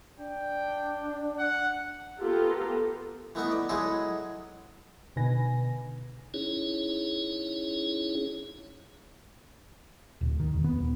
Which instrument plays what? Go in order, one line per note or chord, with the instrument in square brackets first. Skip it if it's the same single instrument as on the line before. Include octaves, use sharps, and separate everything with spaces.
[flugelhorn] D4 [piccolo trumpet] G5
[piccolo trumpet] F#5
[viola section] B3 F4 G4 A4 A#4
[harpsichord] E3 A3 B3 D#4 E5
D5
F#3 G#3 D#4 E4 G#4 A4
[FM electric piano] B2 D3 D#4 B4 G#5 A#6
[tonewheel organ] C#4 D#4 E4 G#4 C#5
[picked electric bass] D1
D#3
E1
B3
D#1